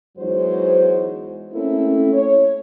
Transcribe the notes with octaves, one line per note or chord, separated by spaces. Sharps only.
E2 F#3 G#3 D#4 C5
A3 A#3 C4 C#4 E4 A4
C#5